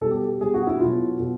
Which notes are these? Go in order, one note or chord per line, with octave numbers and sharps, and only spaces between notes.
B2 G3 A4
G4
B2 G3 G#4
F#4
E4
B2 F#3 F4
B2